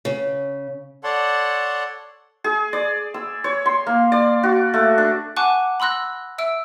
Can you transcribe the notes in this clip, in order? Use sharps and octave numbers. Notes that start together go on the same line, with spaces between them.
C#3
A4 C#5 D5 F#5 A5 C6
G#4
D5
E6
C#5
C6
A#3
D5
F#4
A3
D4
F#5 G#5 A5 C#6 D6 F#6
B5 C6 E6 F#6 A#6
E5 E6 D7